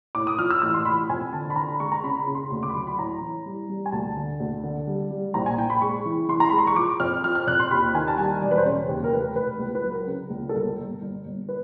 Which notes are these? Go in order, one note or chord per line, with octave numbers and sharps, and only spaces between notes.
A2 D6
D#6
F3 F6
E6
A1 E6
C6
A1 B5
F2 G#5
D3 A5
B5
D3 A#5
B5
G#3 C#6
A#5
C#3 B5
B5
C#3
C6
D2 C6
D6
B5
F#3 C6
B5
A2 A#5
E3
G3
G3
G#5
D2 A5
D3
D2
D3
G3
G3
A#1 A#5
G#5
A#1 G5
B5
G#3 C#6
E3
E3 C6
A#5
G#3 B5
C6
C#6
F3 D6
F2 F6
F3 F6
F6
F2 F#6
C6
D#2 B5
D#3 G#5
A5
G3 G#5
E1 D5
B4
C5
C#3 C#5
D#2
A#4
F1 B4
F1 B4
C#2
B4
F#3
A#4
C#3
C#2
A4
G1 A#4
G1
G1
G1
B4